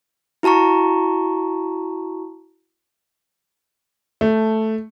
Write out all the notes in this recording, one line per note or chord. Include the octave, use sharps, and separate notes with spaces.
E4 F#4 A5 A#5 C#6
A3